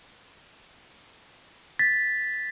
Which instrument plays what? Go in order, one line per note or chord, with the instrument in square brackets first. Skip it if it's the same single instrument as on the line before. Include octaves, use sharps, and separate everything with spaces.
[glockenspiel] A6 B6